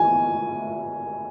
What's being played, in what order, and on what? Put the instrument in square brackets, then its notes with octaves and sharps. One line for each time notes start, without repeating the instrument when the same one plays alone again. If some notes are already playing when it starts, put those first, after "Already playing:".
Already playing: [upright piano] G#5